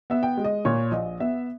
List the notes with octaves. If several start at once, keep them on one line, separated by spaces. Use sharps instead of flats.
B3 E5
G5
G#3
D#5
A#2 C#5
A#1 D#5
B3 E5